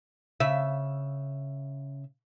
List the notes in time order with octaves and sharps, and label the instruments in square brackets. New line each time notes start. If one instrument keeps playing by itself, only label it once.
[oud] C#3 E5